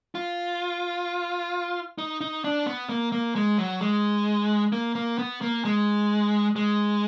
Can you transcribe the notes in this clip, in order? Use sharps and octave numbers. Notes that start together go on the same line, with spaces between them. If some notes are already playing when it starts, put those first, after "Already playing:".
F4
D#4
D#4
D4
B3
A#3
A#3
G#3
F#3
G#3
A#3
A#3
B3
A#3
G#3
G#3